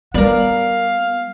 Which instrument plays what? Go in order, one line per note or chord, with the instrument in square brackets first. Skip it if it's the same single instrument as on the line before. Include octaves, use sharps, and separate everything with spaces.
[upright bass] G3 [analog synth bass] B3 [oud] A#4 D5 [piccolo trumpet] F5